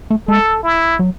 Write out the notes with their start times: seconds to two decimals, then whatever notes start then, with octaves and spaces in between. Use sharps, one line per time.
0.10 A3
0.28 G#3 A4
0.64 E4
0.99 F#3